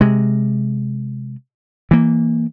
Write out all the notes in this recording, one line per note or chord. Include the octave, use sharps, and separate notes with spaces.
C3 G#3
E3 A#3